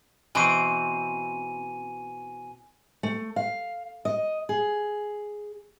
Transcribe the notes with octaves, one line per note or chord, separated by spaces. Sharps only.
B2 E3 C4 G#5 D#7
A3
F5
D#5
G#4